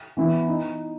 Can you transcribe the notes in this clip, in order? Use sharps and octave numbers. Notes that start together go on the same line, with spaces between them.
E3 B3 E4
D#4